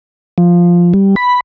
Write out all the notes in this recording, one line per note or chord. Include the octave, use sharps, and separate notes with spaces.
F3
G3
B5